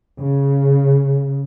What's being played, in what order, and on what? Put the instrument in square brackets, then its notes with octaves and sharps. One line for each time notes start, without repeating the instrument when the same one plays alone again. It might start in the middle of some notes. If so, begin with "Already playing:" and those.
[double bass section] C#3